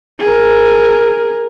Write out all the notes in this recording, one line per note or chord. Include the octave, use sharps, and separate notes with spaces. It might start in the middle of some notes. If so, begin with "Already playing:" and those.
G#4 A#4